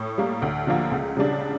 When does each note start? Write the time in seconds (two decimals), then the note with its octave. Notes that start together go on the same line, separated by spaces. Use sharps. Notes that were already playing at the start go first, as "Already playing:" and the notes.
Already playing: A2
0.18 G3 A#3
0.42 D2
0.67 D3 F3 A#3
0.91 C#2
1.17 C#3 G3 D4